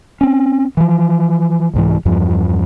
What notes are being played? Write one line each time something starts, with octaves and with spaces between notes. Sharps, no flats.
C4 C#4
E3 F3
C2 G#2 E3
E2 G2 F3